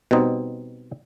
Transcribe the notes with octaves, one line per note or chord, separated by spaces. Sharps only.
B2 G3 C4 D#4